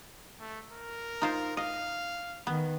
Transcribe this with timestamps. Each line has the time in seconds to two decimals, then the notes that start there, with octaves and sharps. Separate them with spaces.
0.40 A3
0.71 A#4
1.22 D#4 F4 C5
1.57 D#5 F5
2.47 D#3 B3